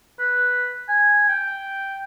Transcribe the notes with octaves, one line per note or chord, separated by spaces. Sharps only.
B4
G#5
G5